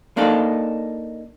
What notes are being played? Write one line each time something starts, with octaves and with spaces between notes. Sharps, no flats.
A#3 D4 D#4 A4